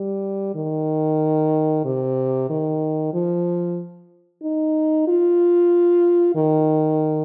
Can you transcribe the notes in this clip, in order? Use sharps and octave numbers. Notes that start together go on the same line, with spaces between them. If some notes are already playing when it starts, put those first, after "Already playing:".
Already playing: G3
D#3
C3
D#3
F3
D#4
F4
D#3